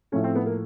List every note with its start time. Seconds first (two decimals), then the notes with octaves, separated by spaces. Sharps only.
0.12 A2 F3 A3 C#4
0.24 C4
0.35 B3
0.46 A#3